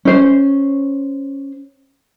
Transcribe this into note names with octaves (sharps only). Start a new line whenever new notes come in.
C#4 C5